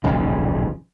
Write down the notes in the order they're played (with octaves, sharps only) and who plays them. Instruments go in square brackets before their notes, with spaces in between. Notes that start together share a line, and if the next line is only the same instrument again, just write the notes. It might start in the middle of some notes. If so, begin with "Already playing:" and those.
[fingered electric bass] D#1 B1 F2 C#3